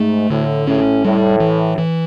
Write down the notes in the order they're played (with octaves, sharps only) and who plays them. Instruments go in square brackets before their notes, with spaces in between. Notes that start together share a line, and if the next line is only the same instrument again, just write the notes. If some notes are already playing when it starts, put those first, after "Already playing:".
Already playing: [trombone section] G#2 [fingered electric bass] A3
[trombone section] A2 [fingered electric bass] D3
[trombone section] A2 [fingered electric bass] C#4
[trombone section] A2 [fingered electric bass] G3
[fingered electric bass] E3
E3